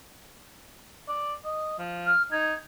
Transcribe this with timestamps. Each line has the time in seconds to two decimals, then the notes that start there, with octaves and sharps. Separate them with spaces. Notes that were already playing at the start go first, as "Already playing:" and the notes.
1.08 D5
1.45 D#5
1.79 F3
2.06 F6
2.31 D#4 G#6